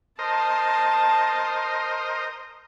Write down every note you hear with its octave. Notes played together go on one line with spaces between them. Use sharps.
A#4 C5 D#5 A5